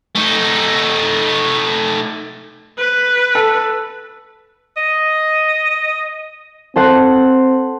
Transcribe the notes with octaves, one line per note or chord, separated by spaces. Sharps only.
A3 D#4
B4
A4
D#5
C4 A4 C5 F#5